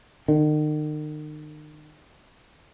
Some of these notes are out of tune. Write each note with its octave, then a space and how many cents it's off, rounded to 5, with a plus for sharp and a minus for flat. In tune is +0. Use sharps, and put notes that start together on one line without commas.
D#3 -40